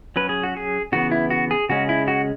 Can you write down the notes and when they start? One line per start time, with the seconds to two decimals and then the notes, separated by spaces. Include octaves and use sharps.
0.16 F#3 C#4 B4
0.29 G#4
0.43 F#4
0.57 G#4
0.92 C#3 E3 B3 F#4
1.11 E4
1.30 F#4
1.51 G#4
1.69 C#3 G#3 C#4 F#4
1.89 E4
2.08 F#4